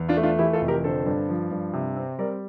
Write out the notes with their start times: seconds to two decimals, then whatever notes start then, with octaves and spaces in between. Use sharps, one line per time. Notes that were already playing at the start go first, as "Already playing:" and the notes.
Already playing: E2
0.09 D4 F4
0.17 A3
0.23 D4 F4
0.39 E3 E4 G4
0.53 F4 A4
0.61 F1
0.68 G4 A#4
0.84 D3 A4 C5
1.06 G2
1.29 F3
1.51 G2
1.73 C3
1.96 C4
2.19 G3 A#4 D5